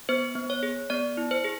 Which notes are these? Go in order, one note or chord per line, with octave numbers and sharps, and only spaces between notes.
B3 C5
B3
C#5
G#4
B3 D5
E4
C5
G#4